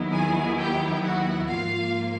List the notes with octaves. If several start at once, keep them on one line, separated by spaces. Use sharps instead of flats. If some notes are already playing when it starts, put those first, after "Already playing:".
Already playing: D#2 D#3 F#3 B3 E4
G#4 G#5
G4 G5
F#4 F#5
G#2 F3 A#3 F4 F5